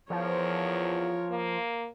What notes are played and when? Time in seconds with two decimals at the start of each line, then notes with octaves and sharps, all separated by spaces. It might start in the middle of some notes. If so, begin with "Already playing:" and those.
0.10 E2 F3 A#4 C#5
1.30 A#3